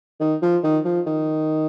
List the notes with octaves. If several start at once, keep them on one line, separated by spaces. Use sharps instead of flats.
D#3
F3
D#3
F3
D#3